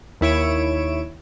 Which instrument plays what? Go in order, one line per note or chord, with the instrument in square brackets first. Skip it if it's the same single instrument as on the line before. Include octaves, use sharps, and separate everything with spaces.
[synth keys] D#2 E4 C#5 D7 E7